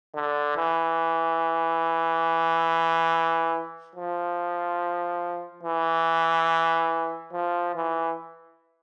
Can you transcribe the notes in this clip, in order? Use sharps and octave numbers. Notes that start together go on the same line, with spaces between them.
D3
E3
F3
E3
F3
E3